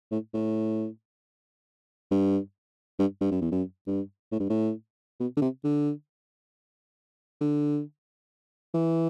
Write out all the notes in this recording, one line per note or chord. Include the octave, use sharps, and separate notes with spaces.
A2
A2
G2
G2
G2
F#2
E2
F#2
G2
A2
G2
A2
B2
D3
C3
D3
D3
E3